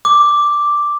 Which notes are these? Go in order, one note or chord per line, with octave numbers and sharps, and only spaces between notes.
D6